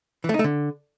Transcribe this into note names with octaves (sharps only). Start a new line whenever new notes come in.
E3
A3
D#4
A3
D3